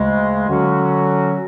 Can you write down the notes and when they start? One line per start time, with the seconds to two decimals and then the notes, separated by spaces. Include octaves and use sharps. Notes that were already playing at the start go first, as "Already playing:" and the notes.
Already playing: D2 C#3 G#3
0.47 D3 F#3 C#4 F#4